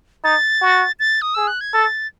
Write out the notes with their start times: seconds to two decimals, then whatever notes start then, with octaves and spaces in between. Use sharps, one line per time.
0.24 D#4 A6
0.62 F#4
0.99 A6
1.22 D#6
1.35 G#4 E6
1.47 F#6
1.61 G#6
1.74 A4 A6